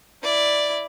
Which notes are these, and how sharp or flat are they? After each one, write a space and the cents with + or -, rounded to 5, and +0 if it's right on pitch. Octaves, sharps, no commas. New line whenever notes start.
E4 +0 D5 +0